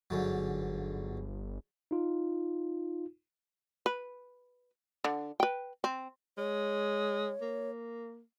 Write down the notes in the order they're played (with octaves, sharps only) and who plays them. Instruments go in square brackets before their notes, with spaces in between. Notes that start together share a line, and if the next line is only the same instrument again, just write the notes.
[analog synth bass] G1 [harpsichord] G#2 D3 F#3
[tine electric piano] D#4 F4
[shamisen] B4
D3
B4 G5
C4
[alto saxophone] G#3 [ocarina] C#5
[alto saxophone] A#3